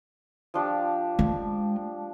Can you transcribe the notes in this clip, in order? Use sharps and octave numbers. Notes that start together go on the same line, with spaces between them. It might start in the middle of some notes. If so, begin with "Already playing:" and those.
F3 D4 G4
G#3